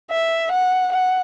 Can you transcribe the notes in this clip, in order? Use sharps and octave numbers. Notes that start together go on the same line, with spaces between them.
E5
F#5
F#5